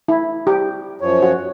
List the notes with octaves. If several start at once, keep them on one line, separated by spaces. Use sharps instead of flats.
E4
G4
F#2 F3 C#5
F#4